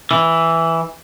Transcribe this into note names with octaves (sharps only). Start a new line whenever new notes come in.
E3